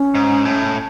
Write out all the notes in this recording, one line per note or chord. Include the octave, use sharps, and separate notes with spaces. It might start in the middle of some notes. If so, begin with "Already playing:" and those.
Already playing: C#4
G#2
A2